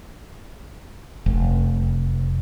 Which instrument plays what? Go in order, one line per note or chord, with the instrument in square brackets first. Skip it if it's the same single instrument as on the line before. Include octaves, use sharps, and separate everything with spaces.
[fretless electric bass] F1